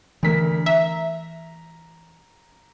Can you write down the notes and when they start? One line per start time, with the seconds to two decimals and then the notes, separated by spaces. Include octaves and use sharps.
0.23 D2 E3 A3 A#4 B6
0.66 E5 A#5